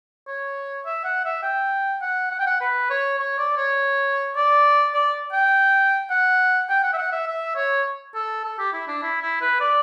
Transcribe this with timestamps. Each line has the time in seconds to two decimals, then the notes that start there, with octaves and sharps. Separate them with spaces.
0.27 C#5
0.86 E5
1.04 F#5
1.25 E5
1.43 G5
2.01 F#5
2.31 F#5
2.39 G5
2.47 F#5
2.60 B4
2.90 C#5
3.19 C#5
3.38 D5
3.57 C#5
4.35 D5
4.94 D5
5.32 G5
6.11 F#5
6.69 G5
6.83 F#5
6.93 E5
6.98 F#5
7.12 E5
7.27 E5
7.56 C#5
8.15 A4
8.44 A4
8.59 G4
8.73 E4
8.88 D4
9.03 E4
9.21 E4
9.41 B4
9.60 D5